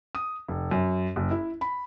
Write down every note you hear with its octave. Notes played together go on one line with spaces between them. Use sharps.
D#6
F1
F#2
F#1
E4
B5